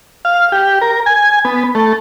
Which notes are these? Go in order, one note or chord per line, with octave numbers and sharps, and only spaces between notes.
F5
G4
A#4
G#5
B3
A3